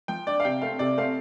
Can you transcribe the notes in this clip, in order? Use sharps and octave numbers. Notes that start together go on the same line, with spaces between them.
F3 G5
D4 D5
F5
C3 G5
A3 C4 F5
C3 D5
A3 C4 F5